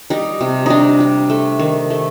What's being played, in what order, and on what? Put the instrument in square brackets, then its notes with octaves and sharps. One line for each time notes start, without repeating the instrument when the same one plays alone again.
[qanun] G3 D#4
C3
G3 D4 D#4
G3
A3
D#3
A3